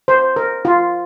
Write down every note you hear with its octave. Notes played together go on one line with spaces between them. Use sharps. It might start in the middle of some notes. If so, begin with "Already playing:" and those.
C5
A#4
F4